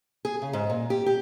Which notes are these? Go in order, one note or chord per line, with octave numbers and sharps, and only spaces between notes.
G#4
C#3
G#2
A#2
G4
G4